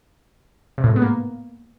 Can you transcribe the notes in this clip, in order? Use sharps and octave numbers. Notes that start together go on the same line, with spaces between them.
C3
A2
G#2
B3
A#3